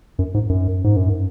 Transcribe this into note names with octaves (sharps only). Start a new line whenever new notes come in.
F#2
G#2
F#2
G#2
F#2